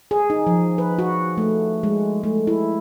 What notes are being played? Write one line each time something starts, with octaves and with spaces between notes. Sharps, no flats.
G#4
D#4
F3
B4
F#4
A3
G#3
A3
E4